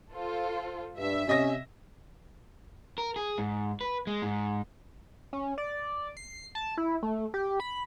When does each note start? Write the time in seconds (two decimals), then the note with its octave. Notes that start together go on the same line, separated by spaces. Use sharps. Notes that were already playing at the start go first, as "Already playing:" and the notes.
0.12 F4 A4 C5
0.98 G2 E5
1.27 C3 C#4 D#5 A#6
2.98 A#4
3.16 G#4
3.38 G#2
3.81 B4
4.07 G#3
4.22 G#2
5.33 C#4
5.58 D5
6.17 C7
6.55 A5
6.78 E4
7.03 A3
7.34 G4
7.60 B5